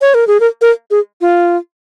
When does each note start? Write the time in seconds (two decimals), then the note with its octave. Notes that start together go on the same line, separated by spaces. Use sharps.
0.01 C#5
0.14 A#4
0.27 G#4
0.40 A#4
0.61 A#4
0.91 G#4
1.21 F4